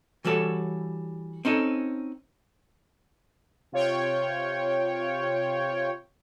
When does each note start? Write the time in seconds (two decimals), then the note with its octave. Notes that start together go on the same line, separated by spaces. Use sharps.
0.25 E3 G3 F#4 A4 C#5
1.45 C4 C#4 D#4 A4
3.72 C3 F4 C#5 G5